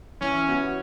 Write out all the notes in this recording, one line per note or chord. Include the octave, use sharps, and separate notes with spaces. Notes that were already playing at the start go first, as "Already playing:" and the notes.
E3 C#4
B3 F#4